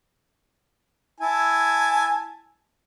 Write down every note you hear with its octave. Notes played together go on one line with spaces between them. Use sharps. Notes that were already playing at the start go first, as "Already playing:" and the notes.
E4 G#5 A5